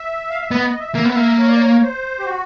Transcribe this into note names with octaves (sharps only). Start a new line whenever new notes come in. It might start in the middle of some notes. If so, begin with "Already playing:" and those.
Already playing: E5
F5
E5
B3 D#5
D#5
E5
A#3
B3 E5
A#3
C#5
D5
C#5
C5
G4
F#4